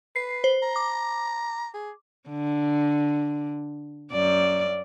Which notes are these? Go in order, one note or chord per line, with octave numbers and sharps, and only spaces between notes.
B4 C7
C5
A#5
D6
G#4
D3
F#2 D5